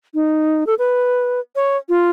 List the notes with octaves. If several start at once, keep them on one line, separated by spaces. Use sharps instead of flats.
D#4
A4
B4
C#5
F4